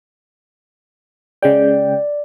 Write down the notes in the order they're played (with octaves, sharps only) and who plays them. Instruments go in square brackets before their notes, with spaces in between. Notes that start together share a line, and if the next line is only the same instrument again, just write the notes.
[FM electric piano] C#3 G#3 G5 [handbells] D5